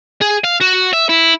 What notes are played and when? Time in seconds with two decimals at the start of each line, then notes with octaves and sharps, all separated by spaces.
0.21 G#4
0.44 F5
0.61 F#4
0.93 E5
1.09 E4